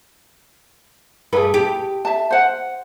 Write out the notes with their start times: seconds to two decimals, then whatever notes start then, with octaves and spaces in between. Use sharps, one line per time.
1.33 G2 A3 G#4 B4 B5
1.54 G4
2.05 E5 A5
2.30 C5 F#5